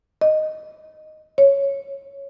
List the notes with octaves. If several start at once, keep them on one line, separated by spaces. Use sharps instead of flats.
D#5
C#5